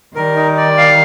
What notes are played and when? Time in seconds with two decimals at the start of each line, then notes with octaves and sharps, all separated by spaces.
0.15 D#3 G3 A#4
0.36 D#4
0.57 D5
0.78 F5